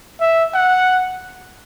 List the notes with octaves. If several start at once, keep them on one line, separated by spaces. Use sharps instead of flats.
E5
F#5